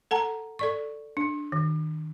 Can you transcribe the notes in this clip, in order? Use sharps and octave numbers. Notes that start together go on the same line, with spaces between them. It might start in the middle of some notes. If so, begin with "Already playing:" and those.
A4 F#5 A5 A#5
A4 D5 C#6
D4
D#3